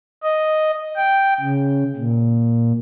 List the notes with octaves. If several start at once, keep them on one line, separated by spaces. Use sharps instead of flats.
D#5
G5
C#3
A#2